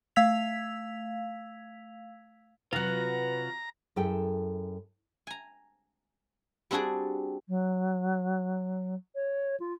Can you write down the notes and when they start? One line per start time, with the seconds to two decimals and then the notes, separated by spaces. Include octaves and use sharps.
0.16 A3 F5 E6 G#6 B6 F7
2.73 C3 F#3 F4 F#4 B4 F#5 A#5
3.96 F#2 E4 G#4 A4 G5
5.27 G#5 A#5
6.71 G3 C4 D4 F#4 G#4 D5
7.48 F#3
9.15 C#5
9.60 F4